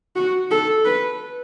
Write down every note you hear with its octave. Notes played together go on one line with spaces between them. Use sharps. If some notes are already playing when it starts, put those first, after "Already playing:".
F#4
A4
B4